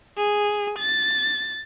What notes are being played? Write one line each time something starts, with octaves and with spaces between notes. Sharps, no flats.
G#4
A6